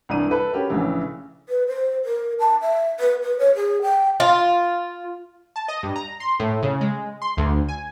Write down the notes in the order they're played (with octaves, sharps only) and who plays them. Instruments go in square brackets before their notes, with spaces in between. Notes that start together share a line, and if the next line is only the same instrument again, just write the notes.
[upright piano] C2 E3 D4 D#7
A4 B4
C#4 F#4 G4 A#4
A#1 A2 C#3 E3
[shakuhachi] B4
C5
A#4
A5
E5
B4
B4
C#5
G#4
G5
[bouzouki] F4
[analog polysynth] A5
D#5
G2
A#5
C6
A2
C#3
G#3
C6
D2
G#5